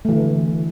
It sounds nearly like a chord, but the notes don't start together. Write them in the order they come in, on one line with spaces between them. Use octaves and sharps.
A3 E3 D3